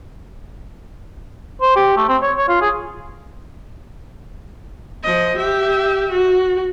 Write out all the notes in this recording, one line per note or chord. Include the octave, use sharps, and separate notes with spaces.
C5
G4
A3
C4
C#5
C#5
F4
G#4
F3 D#5
G4 E5
F#4